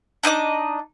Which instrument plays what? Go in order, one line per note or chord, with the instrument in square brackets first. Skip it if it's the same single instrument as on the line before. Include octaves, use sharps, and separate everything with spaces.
[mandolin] D4 D#4 D#5 D6